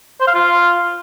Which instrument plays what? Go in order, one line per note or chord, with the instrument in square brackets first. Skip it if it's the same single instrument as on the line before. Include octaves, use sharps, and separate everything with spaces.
[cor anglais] C5
F5
F4